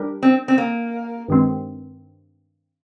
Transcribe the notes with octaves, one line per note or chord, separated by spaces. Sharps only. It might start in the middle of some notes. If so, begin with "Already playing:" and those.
Already playing: G3 D4 G4 A#4
C4
C4
A#3
G2 D#3 G#3 C4